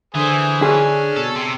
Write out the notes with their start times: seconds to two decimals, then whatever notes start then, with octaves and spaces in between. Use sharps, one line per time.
0.14 D3 E3 G#4 C5
0.62 C#4 D4 G#4
1.16 B2 A4
1.36 C3 E6